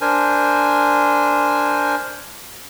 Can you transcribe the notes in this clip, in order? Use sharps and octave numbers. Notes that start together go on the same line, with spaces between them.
D4 A#4 C5 G#5